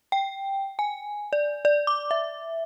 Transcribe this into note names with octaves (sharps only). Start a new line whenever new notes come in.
G5
G#5
D5
D5
D6
E5